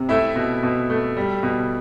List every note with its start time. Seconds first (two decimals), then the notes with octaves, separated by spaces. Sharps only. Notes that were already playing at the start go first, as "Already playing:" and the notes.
Already playing: C3
0.09 A3 E4 E5
0.36 B2
0.63 B2
0.90 A3
1.17 G3
1.43 B2